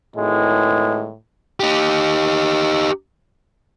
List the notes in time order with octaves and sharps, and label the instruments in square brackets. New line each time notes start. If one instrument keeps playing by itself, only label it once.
[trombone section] G#1 E3 G#3 [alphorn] A2
[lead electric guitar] D#4 G4